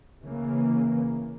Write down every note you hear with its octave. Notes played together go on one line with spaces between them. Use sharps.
C#3 E3 A#3